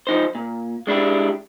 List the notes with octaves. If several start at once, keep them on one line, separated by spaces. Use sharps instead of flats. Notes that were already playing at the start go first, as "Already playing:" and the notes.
F3 D#4 C5
A#2
G#3 D4 E4 G4